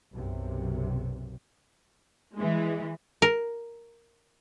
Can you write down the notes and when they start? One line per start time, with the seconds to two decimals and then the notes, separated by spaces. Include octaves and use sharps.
0.14 B1 F#2 C3
2.34 E3 G#3
3.22 A#4